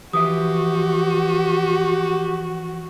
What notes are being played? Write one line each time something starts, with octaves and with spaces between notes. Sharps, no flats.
E3 F3 F#4 G4 E5 D#6